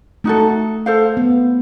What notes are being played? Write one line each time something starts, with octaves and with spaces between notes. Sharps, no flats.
A3 D#4 F#4 A4
A4 C5 F5
B3